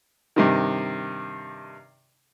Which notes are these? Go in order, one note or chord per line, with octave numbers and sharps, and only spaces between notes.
G2 C3 D#3